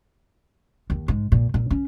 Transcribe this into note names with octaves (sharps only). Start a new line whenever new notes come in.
D#2
G#2
A#2
A#2
C#4